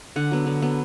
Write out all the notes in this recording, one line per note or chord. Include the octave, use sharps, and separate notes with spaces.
D3 F#5
F#3 B3
D3
F#3 B3